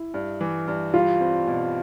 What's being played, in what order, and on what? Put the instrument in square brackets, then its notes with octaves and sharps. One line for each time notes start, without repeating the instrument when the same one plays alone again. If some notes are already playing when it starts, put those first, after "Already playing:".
Already playing: [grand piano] E4
[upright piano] G2
E3
G2
[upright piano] G3 [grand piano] F4
[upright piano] C4
B2